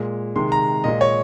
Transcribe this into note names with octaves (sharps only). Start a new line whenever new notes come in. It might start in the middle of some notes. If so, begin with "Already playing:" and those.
Already playing: A#2 G#3
C3 D#3 G#3 C6
A#5
A#2 G#3 D#5
C#5